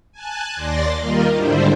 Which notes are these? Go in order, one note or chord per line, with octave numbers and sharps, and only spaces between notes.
G#5 A5 F#6
D#2 D5 C6 A6 A#6
D#3 G3 A#3 F4 A#4 D#5
G#2 D3 G3 D4 E4 C5